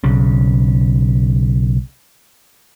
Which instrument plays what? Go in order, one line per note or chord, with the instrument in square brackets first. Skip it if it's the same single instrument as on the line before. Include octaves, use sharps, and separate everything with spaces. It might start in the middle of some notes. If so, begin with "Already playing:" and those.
[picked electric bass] B1 C#3